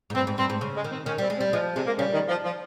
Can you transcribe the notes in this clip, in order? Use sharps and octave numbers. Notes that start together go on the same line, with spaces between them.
G#2
G2 C4
G#2
G2 C4
G#2
C#3
G#3
D#3
C4
D#3 C#4
G3 C4
G#3
C4
G3
F3 G#3
C3 G#3
A#3
C#3 G3
D#3
F3
F3